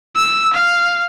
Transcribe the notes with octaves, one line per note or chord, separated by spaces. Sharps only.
E6
F5